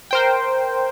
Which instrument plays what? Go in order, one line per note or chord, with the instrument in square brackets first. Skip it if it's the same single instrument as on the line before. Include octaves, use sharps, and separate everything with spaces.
[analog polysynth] A#4 C5 G5